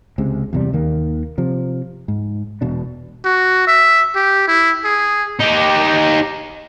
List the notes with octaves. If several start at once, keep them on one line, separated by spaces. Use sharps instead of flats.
C#2 C3 G#3
E2 C3 G3
D#2 D#3 A#3
C3 F3
G#2
E1 B2 D4
F#4
E5
G4
E4
G#4
D#4 G4